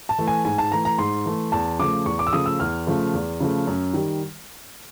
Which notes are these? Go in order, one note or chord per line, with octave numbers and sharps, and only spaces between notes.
A5
E3 A3
G#5
G#2 G#5
A5
E3 A3 A#5
A#5
G#2 C6
E3 A3
E2 A5
C#3 F3 A3 D6
E2 C#6
D6
E6
C#3 F3 A3 D#6
E6
E2 F6
C#3 F3 A3
E2
C#3 F3 A3
F#2
D#3 G3